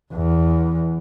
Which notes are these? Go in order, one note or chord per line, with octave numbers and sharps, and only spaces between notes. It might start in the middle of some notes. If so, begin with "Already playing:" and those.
E2